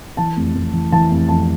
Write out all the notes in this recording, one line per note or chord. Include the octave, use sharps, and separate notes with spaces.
E3 A5
F1
F1
E3
E3 A5
F1
F2 A5